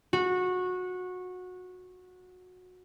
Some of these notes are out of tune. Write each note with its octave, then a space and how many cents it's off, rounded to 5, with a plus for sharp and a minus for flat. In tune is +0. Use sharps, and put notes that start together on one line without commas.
F#4 -20